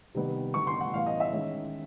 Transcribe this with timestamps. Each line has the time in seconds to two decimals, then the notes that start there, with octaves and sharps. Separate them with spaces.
0.15 C3 D#3 G3 B3
0.54 D3 G3 B3 C#6
0.67 C6
0.80 F#5
0.94 A2 E3 G3 B3 F5
1.06 D#5
1.20 E5
1.33 D#3 G#3 C#4